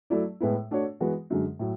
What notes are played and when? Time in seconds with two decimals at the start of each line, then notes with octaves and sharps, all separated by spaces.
0.10 F#3 A3 E4 A4 D5
0.40 A2 G#3 B3 E4
0.71 A3 D4 F#4 C#5
1.00 E3 G#3 B3 F#4
1.30 F#2 D3 G#3
1.59 A2 F#3